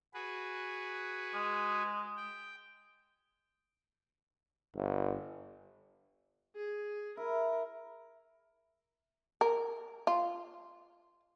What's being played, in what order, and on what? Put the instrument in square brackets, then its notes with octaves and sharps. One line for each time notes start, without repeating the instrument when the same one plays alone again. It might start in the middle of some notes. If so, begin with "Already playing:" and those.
[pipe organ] F#4 G#4 B4
[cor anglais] G#3
[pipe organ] G5
[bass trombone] G1
[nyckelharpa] G#4
[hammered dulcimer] E4 [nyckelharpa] A#4
[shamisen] A#4
F4